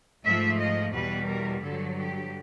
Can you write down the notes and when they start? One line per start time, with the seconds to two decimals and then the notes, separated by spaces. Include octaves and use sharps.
0.24 G#2 F3 A3 E5
0.59 D#5
0.93 E2 B2 G3 B4
1.27 A#4
1.62 G2 D3 F#3 A4
1.97 G4